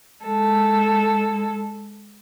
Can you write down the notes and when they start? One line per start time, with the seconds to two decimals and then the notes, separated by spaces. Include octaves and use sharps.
0.23 G#3 A4